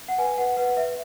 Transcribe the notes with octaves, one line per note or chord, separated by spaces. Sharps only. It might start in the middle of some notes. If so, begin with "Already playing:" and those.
F#5
B4 G#5
B4 F#5
B4 F#5
B4 E5